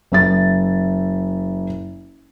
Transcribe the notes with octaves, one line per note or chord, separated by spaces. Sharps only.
F#1 E5 A6